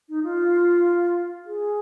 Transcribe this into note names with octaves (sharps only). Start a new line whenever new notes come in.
D#4
F4
G#4